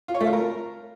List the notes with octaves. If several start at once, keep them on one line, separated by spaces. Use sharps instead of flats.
F4
C#5
A3
F4
A#4